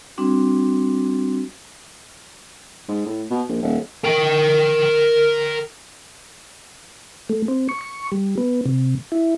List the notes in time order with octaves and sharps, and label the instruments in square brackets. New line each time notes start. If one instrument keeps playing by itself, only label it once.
[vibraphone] G3 C4 D4 F#4
[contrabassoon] G#2
A2
B2
A#1
D#1
[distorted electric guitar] A#4 G5
[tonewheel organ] A3
C4
C#6
C#6
G3
B3
C3
E4